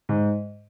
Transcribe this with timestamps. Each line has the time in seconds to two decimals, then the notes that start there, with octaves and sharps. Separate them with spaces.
0.09 G#2